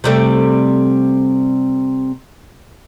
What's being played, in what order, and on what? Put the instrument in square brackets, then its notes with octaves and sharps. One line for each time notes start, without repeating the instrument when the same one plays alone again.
[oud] C3 G3 A3